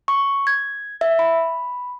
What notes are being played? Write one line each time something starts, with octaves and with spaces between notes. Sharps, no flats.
C#6
G#6
E5
B5